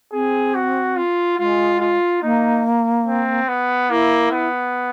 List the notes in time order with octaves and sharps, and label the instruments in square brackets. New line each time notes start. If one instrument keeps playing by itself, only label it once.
[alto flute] C4 [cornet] G#4
[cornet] F#4
F4
[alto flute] G#3 [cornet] F4
[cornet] F4
[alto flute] A#3 [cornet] D#4
[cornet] C4
B3
[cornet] A#3 [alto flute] E4
[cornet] B3